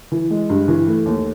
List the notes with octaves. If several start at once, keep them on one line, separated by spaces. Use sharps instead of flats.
E3
G#3
G2
E3
A3
D#2